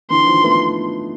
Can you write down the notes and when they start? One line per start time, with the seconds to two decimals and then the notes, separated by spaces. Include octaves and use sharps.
0.10 D3 E3 C6
0.27 D#3 F3
0.43 A3 B3